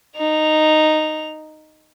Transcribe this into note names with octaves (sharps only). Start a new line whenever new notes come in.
D#4 F7